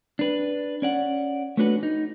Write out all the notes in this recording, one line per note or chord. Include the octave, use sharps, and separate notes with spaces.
D4 B4
C#4 D5 F#5
A3 B3 C#4 D4 F#4 B4
D#4